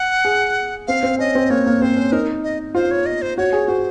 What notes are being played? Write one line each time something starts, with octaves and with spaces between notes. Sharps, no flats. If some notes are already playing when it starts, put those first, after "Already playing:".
Already playing: F#5
G#4
C4 F5
C4
C#4 D#5
C4
A#3 C#5
A#3
C4 C5
C#4
D#4 A#4
D#5
F4 C5
C#5
D#5
C5
F#4 C#5
G#4
F#4 C5